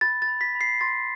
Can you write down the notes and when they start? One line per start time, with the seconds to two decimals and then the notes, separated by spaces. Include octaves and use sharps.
0.01 B5 A6
0.22 A6
0.28 B5
0.41 B6
0.55 B5
0.61 C7
0.81 C6 A6